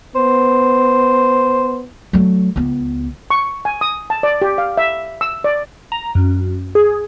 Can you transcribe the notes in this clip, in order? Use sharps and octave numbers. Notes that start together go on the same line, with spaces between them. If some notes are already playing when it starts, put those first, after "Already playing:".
B3 C5
F#3 A3
C#2 B3
C#6
G#5
D#6
A5
D5
G4
F5
E5
E6
D5
A#5
F#2
G#4